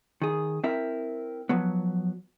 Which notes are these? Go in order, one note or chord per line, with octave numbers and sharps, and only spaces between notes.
D#3 G#4
C4 E4 A#4 E5
F3 F#3 B3